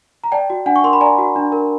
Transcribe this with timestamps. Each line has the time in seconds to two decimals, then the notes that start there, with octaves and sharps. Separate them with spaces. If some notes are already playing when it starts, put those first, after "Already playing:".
0.24 A#5
0.32 D5 G5 A5
0.50 F#4
0.66 D4 F#5 G#5
0.76 C#6
0.84 A#4 C6
0.93 B5
1.01 D5 G#5 A#5
1.18 F#4
1.36 D4
1.52 A#4